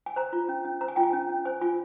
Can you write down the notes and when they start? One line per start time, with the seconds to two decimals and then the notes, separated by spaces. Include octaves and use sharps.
0.06 G#5
0.16 C5 A#5
0.33 F4
0.49 C#4
0.65 C#4
0.81 C5 A#5
0.88 G#5
0.96 F4 G5
1.03 G#5
1.13 C#4
1.29 C#4
1.45 C5 G#5
1.61 F4 G#5